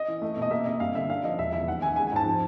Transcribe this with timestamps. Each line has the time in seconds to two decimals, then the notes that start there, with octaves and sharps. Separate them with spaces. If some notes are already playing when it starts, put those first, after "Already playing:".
Already playing: D#5
0.08 E3
0.22 A3
0.37 B2
0.42 D#5
0.51 A#3 E5
0.66 C3 D#5
0.80 G2 F5
0.95 D3 E5
1.09 D4 F5
1.23 F3 D#5
1.39 E1 E5
1.53 E2 E5
1.67 D#2 F#5
1.82 D#3 G#5
1.96 G#3 G#5
2.07 G#5
2.12 G#2 A5
2.26 F3